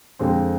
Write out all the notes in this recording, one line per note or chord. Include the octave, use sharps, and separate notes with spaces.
F2 D3 G#3 C4